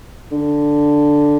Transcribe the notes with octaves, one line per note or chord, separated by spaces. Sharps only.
D3